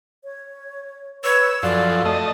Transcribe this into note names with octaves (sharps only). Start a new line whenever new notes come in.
C#5
B4 C#5 E6
F#2 F3 A4 D5
A3 D#5